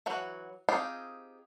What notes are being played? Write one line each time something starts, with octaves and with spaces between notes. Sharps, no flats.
E3 F#3 F#4
C4 D#4 F4 G4 G#4